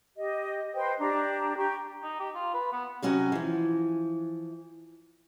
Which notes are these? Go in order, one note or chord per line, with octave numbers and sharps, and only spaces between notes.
G4 D#5
B4 C5 D#5 G5
D4 G4 A#5
G4 G5 A#5 C#6
D#4
G4
F4
B4
B3
C3 F#3 C#4 F#4
E3 F3